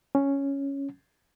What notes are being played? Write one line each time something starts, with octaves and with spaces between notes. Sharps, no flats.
C#4